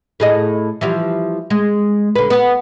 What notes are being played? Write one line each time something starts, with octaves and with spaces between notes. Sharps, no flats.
A2 G#4 D#5
E3 F3 G3
G#3
D3 B4
B3